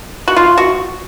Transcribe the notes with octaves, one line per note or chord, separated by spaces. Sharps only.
F#4
F4
F#4